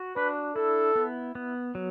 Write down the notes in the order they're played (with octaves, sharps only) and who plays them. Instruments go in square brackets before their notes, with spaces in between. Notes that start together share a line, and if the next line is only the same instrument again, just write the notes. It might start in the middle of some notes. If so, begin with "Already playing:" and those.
Already playing: [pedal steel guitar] F#4
[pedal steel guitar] D4 [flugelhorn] B4
[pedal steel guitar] E4 [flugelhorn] A4
[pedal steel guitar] B3
B3
F#3